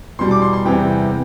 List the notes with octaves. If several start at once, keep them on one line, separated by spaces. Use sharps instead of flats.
E2 B2 G3 C6
D6
C6
C6
E2 C3 E3 G3 G5